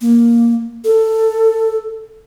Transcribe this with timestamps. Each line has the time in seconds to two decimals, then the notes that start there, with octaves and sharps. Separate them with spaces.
0.01 A#3
0.84 A4